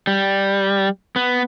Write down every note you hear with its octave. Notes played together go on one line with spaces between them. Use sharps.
G3
B3